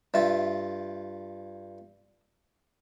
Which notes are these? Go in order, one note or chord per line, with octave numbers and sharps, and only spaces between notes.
G2 F4 E5